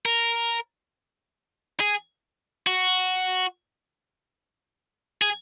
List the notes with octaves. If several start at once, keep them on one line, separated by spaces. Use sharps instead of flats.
A#4
G#4
F#4
G#4